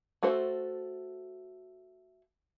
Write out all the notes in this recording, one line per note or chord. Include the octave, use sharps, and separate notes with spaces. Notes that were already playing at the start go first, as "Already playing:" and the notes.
A3 F#4 A4 C5